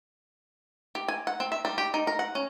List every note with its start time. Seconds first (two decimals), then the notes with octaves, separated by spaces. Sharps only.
0.95 G4
1.08 G#5
1.27 F#5
1.40 C4
1.52 E5
1.65 G3
1.78 G4
1.94 D#4
2.07 A#4
2.19 F#5
2.35 C#4